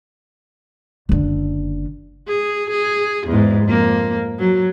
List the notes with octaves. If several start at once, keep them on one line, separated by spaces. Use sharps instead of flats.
F#1 D3
G#4
G#4
E2 G#2
F2 A#3
F#3